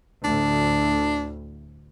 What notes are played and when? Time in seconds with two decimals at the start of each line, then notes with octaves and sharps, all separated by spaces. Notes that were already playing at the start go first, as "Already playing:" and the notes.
0.24 D2 A2 D4